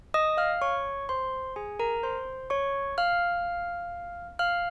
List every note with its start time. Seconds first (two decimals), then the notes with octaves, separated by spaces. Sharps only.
0.14 D#5 D#6
0.37 F5 F6
0.61 C#5 C#6
1.09 C5 C6
1.56 G#4 G#5
1.79 A#4 A#5
2.03 C5 C6
2.50 C#5 C#6
2.98 F5 F6
4.39 F5 F6